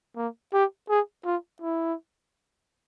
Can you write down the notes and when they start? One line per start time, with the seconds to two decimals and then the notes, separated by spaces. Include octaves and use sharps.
0.16 A#3
0.53 G4
0.89 G#4
1.25 F4
1.62 E4